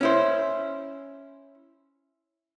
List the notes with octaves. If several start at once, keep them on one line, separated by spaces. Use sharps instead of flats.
C#4 E4 C5